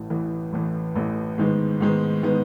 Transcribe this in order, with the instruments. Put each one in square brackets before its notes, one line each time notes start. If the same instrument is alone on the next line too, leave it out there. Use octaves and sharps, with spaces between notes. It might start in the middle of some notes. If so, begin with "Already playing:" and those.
Already playing: [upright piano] A1 A2 E3
A1 A2 E3
A1 A2 E3
A1 A2 E3
G#2 D#3 G#3 B3
G#2 D#3 G#3 B3
D#3 G#3 B3